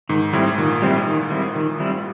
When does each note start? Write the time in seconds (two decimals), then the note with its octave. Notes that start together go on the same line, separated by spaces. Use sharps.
0.09 G#2 D#3
0.33 A2 G3 C4 E4
0.58 A#2 D#3
0.82 G3 C4 E4
1.07 D#3
1.30 G3 C4 E4
1.56 D#3
1.80 G3 C4 E4